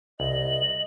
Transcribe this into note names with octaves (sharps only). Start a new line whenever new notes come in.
C2 D#5 F#7